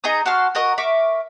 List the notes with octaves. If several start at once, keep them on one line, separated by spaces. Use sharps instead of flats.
D#4 G#4 A#5 D#6
F#4 A5 C6 F6
F#4 A#4 D#5 A#5
A#4 E5 C#6 D6